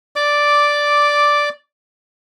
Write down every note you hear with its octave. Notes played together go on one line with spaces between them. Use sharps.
D5 D6